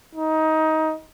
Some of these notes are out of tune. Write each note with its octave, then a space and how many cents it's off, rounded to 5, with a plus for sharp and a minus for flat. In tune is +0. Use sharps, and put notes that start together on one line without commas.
D#4 +20